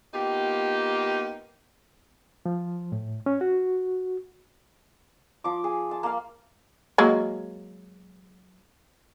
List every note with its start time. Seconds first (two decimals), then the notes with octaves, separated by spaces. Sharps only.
0.14 A#3 B3 D#4 F4 G4
2.46 F3
2.92 A2
3.26 C#4
3.41 F#4
5.44 F3 D6
5.64 G#4
5.91 A5
6.03 A#3 F5
6.98 F#3 G#3 A#3